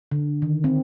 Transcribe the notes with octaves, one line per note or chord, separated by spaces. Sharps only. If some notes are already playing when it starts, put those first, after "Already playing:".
D3
D#3
C4